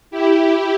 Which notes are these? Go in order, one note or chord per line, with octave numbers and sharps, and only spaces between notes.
E4 G4